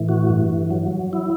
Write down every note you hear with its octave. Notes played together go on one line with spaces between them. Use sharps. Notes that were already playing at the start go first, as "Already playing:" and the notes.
Already playing: A2 E3
F#4
G2
F#3
E4